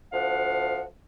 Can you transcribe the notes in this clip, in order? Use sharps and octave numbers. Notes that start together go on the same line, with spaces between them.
D2 F3 F5 F#5